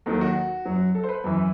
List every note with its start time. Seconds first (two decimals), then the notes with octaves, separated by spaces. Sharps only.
0.06 D#2 D#3 F#3 A4
0.21 F#4
0.65 F#2 F#3
0.95 A4
1.04 C5
1.09 B4
1.24 F#2 E3